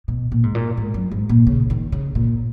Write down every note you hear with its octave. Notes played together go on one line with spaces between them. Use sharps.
B2
A#2
G#2
A#2
G#2
F#2
G#2
A#2
C#3
D#3
C#3
A#2